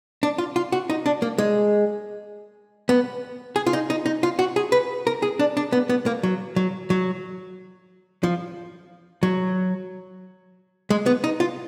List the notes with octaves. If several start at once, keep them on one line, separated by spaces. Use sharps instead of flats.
D4
F4
F4
F#4
D#4
D4
A#3
G#3
B3
G#4
F4
D#4
D#4
D#4
F4
F#4
G#4
B4
A#4
G#4
D4
D4
B3
B3
A#3
F#3
F#3
F#3
F3
F#3
G#3
B3
D#4
F4